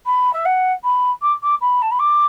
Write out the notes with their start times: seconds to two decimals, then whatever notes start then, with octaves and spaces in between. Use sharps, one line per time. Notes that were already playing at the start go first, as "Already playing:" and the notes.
0.06 B5
0.33 E5
0.45 F#5
0.84 B5
1.22 D6
1.43 D6
1.61 B5
1.82 A5
1.91 B5
1.99 D6